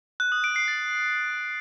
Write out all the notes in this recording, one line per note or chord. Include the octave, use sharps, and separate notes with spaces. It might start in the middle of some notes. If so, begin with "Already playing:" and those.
F#6
D#6
D7
C7
A6